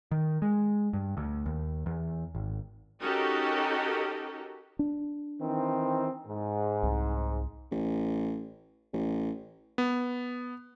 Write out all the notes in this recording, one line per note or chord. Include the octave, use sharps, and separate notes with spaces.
D#3
G#3
G2
D2
D#2
E2
G#1
C#4 D#4 F#4 G4 A4 A#4
D4
D#3 E3 C4
G#2
C2
A1
A1
B3